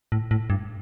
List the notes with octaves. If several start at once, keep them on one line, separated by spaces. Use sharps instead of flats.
A2
A2
G2